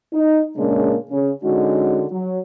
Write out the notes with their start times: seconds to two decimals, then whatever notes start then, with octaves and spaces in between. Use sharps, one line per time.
0.13 D#4
0.57 A#2 C#3 G#3 A#3 C#4 D4
1.11 C#3
1.43 D3 G#3 C#4 D#4 F#4
2.11 F#3